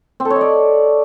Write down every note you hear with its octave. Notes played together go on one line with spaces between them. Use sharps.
C4
A4
C#5
D#5
D5